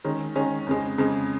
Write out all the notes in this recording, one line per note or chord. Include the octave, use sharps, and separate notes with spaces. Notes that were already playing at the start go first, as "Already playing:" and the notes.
D#3 G#3 C#4
D#3 G#3 C#4
F2 C#3 G#3
F2 C#3 G#3